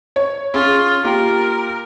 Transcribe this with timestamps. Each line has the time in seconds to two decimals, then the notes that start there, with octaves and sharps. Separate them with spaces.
0.16 C#5
0.54 C#4 F4 G#4
1.04 A#3 F4 G4 A#4